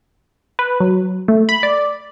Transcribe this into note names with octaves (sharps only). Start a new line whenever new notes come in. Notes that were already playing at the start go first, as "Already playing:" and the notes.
B4
F#3
A3
B5
D5